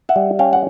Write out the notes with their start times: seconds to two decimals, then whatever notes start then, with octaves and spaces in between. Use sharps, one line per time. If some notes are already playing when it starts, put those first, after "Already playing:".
0.09 E5 F#5
0.16 G3
0.39 C#4 F5 G5
0.53 F#5